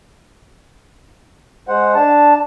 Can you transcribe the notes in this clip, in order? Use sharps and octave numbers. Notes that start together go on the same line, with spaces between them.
G#3 C5 F#5
D4 A5